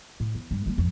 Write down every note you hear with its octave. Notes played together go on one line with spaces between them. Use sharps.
A2
E2
G2
G3 A#3
G#1 F2